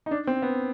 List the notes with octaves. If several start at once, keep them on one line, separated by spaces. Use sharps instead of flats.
D#4
D4
C4
B3